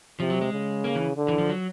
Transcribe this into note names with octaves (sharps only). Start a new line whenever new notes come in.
C3 F3
F#3
G#3
C#3
A#3
E3
D3
E3
F3
F#3